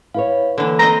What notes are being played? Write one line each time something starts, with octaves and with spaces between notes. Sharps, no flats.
E4 B4 C#5 F5
D3 E3 A#3 A4
C4 C5 D#5 A#5